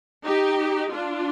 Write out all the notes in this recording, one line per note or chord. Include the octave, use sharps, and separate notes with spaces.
D#4 G4
D4 F4